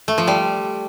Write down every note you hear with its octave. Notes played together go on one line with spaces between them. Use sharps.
A3
F3
G3